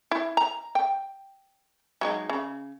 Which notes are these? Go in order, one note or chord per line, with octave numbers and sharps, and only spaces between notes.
E4
A#5
G5
F#3 G#3 D#4
C#3